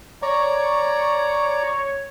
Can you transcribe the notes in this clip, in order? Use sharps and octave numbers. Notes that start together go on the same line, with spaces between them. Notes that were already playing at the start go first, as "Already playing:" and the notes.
C#5 D5 A#5